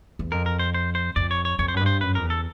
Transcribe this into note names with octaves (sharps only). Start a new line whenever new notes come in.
E2
F2 A#4
A#4
C5
C5
C5
F2 D5
C#5
C#5
F2 C#5
C5
F#2
B4
G2
C5
F#2 B4
F2 A#4
E2
A4